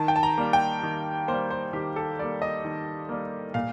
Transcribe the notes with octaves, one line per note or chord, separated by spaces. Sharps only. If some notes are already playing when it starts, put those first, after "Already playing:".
Already playing: D#3 A5
G5
A5
A#5
G3 A#3
G5
D#3
G3 A#3 C5
C5
D#3 G4
A4
G3 A#3 D5
D#5
D#3
G3 A#3
A#2 F5